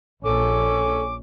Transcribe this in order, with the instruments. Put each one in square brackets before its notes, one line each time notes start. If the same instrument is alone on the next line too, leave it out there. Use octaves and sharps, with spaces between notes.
[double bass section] A#1 [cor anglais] C#4 [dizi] A4 [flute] D6